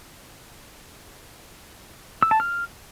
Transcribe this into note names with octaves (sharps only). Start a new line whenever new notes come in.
E6
A5
F6